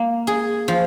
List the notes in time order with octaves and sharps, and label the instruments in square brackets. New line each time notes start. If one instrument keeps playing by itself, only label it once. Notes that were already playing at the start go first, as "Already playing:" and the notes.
Already playing: [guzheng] A#3
G#4
F3